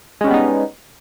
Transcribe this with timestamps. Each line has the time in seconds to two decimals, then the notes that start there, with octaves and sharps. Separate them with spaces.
0.21 G#3
0.24 C#4
0.27 G3
0.30 B3
0.34 D#4